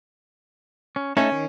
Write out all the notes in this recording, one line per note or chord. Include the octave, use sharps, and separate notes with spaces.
C#4
A3 C#4 D#4 A4
D#3